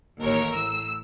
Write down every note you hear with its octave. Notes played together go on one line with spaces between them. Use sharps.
A1 D#2 A#4 C#5
A2 E6